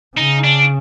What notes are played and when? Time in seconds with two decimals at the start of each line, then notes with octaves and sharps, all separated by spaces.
0.17 C#3 D#4
0.44 D4